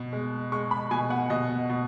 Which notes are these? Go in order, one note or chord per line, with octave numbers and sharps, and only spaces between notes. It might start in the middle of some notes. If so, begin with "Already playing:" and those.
Already playing: B2
G#3
G#3 C#6
B5
B2 G#5
F#5
B2 D#5
B2